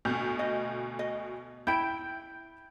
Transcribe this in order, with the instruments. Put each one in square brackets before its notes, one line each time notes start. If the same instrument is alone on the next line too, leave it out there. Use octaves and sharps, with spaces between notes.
[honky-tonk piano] D2 B2 G6
[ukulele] D#5
D#5
[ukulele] E4 G5 B5 [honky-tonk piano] G6 D7